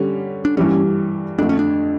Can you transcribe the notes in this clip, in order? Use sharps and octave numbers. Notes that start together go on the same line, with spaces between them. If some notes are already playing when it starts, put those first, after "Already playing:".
Already playing: D3 G3 C#4
D4
G2 E3 G3 C#4
F2 D3 A3 D4
C#4
D4